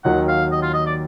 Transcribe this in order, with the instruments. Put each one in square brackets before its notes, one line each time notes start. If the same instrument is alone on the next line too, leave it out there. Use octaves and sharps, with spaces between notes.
[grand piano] D#2 D#3 F#3 [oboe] F#5
[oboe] F5
D#5
F4
D#5
D5